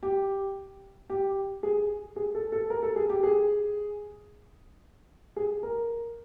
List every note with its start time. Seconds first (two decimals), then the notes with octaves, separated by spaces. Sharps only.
0.03 G4
1.10 G4
1.63 G#4
2.16 G#4
2.35 A4
2.52 A4
2.70 A#4
2.83 A4
2.96 G#4
3.10 G4
3.23 G#4
5.36 G#4
5.63 A#4